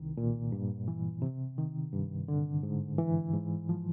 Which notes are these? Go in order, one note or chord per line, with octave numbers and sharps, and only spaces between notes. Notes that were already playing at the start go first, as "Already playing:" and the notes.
Already playing: C2 D#3
A#2
G2
E3
C3
D#3
G2
D3
G#2
E3
G#2
F3